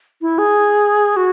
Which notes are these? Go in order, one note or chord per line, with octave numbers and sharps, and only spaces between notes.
E4
G#4
F#4